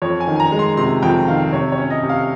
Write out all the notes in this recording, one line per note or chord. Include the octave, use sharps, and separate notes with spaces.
F2 C#5
G#5
D#3
G#5
A#5
G#3
C6
C3 C6
F2 G5
D#3 F5
C3 C#5
C#5
C#4
D#5
C3
F5